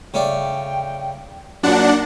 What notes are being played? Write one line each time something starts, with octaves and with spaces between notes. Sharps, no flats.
C#3 A3 D4 G5
F#2 A#2 D4 D#4 F#5